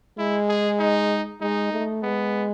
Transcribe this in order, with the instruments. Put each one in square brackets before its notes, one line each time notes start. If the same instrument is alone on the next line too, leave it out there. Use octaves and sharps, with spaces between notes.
[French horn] G#3 [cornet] E4
[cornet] G#4
D#4
[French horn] G#3 [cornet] D#4
[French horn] A3
[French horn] G#3 [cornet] B3